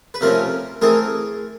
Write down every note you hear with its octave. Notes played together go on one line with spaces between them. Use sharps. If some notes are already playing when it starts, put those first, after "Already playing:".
B4
C3 F3 A3 C#4 A#4 C5
E3 A3 C4 G#4 A#4